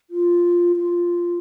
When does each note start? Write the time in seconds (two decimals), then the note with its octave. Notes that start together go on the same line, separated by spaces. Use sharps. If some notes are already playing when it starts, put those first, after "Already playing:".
0.10 F4
0.76 F4